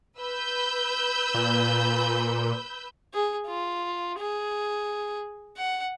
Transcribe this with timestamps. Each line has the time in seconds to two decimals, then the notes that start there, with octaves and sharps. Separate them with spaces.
0.18 B4 E6 G6
1.34 A#2
3.14 G#4
3.47 F4
4.18 G#4
5.57 F#5